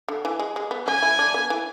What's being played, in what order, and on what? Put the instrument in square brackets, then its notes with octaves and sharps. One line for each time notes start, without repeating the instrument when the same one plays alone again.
[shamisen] D3
E3
G#3
G#3
B3
[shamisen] C#4 [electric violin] G#5
[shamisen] E4
D4
B3
E3